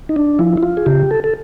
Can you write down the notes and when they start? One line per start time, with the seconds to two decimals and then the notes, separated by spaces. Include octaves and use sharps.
0.09 D#4
0.16 D4
0.39 F3 E4
0.57 E4
0.63 F4
0.77 G#4
0.86 C#3 G4
1.11 A4
1.24 A4